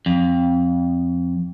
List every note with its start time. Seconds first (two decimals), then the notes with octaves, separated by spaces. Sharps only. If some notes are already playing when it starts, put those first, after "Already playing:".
0.06 F2